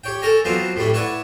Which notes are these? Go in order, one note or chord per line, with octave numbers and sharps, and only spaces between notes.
G4 C#5 G5
A4 A#4 C#5 G#5 A#5
F#3 B3 C4 D4 F4
A2 G3 A3 C#4
E4 B4 C#5 D5 F#5